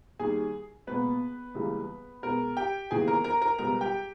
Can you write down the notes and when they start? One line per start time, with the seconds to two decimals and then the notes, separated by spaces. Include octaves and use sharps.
0.19 D#2 D#3 G3 G#4 G#5
0.87 C#2 B2 A#3 B3 B4
1.55 C#2 C#3 E3 G3 A#3
2.23 B2 G#3 B3 A#4
2.56 G4 G5
2.91 D#2 C#3 E3 G#3 B3 G#4 G#5
3.07 A#4 A#5
3.24 A#4 A#5
3.41 A#4 A#5
3.58 C#2 B2 G3 B3 A#4 A#5
3.81 G4 G5